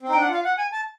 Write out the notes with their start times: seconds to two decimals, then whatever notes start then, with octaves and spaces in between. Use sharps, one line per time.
0.02 C4
0.09 D#4
0.12 G5
0.16 D4
0.22 F#5
0.29 F4 F5
0.44 F#5
0.57 G#5
0.71 A5